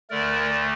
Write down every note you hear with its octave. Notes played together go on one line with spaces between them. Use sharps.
D2 D3 A3 A#4 D5